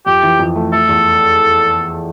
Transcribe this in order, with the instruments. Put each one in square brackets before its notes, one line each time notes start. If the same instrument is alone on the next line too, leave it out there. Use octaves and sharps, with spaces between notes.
[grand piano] F2 [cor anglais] G4
[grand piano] E3
F2
A3
[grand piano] A3 [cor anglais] A4
[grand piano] E2